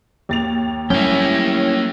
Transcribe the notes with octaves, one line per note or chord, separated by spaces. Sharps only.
D#2 A6 F7
A2 F#3 G3 A#3 C#4 E4 G4